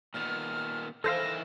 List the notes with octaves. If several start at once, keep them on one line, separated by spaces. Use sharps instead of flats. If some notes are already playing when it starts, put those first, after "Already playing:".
A#2 D#3 B3 F6
D#3 E3 E4 A4 C5 F5 A#6